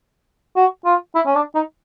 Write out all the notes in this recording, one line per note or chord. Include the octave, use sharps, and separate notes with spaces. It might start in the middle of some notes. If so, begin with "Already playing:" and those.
F#4
F4
E4
C#4
D4
D#4